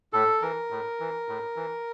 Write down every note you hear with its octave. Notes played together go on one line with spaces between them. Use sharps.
A2 A4
E3 A#4
A2
E3
A2
E3